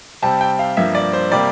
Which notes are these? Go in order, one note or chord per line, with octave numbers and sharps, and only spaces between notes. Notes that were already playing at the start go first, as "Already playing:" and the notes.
C3 G3 C4 A5
G5
F5
G2 F3 A#3 E5
D5
C5
C3 G3 A#3 D5